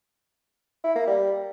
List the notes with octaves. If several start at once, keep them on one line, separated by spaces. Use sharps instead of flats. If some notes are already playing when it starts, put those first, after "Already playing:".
E4
A#3
G3